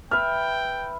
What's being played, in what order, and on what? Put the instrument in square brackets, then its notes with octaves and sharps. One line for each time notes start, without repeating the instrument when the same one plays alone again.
[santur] B4 E5 [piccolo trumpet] G5 [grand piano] F6